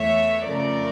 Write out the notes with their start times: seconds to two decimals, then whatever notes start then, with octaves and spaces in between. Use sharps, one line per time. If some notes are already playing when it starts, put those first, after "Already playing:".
Already playing: E2 E3 A3 C#5 E5
0.47 F2 C#3 F3 A3 A#4 D5